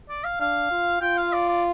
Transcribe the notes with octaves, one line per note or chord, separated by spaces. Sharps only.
D5
F5
D4 F5
F4
F4 G5
F5
D5
D5